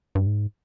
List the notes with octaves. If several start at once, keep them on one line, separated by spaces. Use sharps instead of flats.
G2
G#2